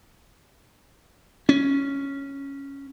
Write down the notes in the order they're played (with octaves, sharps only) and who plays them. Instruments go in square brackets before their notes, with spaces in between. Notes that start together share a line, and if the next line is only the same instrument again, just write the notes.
[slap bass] C#4